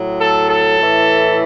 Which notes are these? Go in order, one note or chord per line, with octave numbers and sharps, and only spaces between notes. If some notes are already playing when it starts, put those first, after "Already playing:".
Already playing: A2 F#3
A4
A4
A2 E3